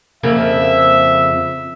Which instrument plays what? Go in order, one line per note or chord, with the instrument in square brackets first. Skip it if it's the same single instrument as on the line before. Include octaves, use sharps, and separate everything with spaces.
[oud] F2 C#3 A#3 [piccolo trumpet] E5